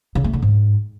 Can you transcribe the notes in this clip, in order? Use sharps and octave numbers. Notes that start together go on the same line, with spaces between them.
C#3
A3
D3
G#2